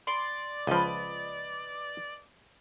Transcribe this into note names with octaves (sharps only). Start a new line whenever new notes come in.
D5 C6
C#2 F3 B4 D#5